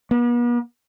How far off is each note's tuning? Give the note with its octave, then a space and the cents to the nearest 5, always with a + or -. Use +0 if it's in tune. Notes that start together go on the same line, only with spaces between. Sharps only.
B3 -45